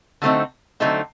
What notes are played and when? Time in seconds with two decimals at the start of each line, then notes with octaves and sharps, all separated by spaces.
0.22 D3 F#3 A3 C4 D#4
0.80 D3 F#3 A3 C4 D#4